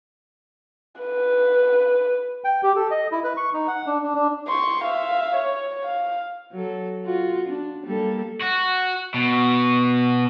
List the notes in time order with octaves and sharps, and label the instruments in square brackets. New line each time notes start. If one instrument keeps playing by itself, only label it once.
[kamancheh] B4
[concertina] G5
G4
A4
D#5
E4
B4
C#6
D#4
F#5
D4
D4
D4
[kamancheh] C6 C#6
E5 F5
C#5
F5
[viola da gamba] F#3 A4
F4 F#4
D4
G3 A#3 A4
[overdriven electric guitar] F#4
B2